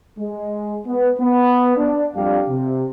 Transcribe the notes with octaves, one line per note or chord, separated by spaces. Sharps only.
G#3
B3
B3
D4
F2 G3 D4 G4 F5
C3